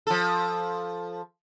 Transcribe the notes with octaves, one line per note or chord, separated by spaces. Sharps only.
F3 A4